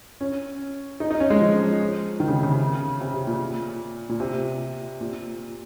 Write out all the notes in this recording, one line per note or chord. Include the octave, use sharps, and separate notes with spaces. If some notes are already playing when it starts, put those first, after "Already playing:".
C#4
D#4
D#4
C#4
G#3
F3
D#3
C#3
C3
C#3
C3
C3
A#2
A#2
C3
A#2